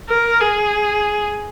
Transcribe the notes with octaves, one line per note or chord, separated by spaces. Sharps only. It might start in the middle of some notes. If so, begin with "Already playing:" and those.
A#4
G#4